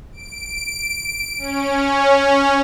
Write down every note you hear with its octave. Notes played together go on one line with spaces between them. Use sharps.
D7
C#4